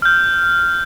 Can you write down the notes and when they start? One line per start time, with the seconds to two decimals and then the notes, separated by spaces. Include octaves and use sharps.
0.02 F6 G6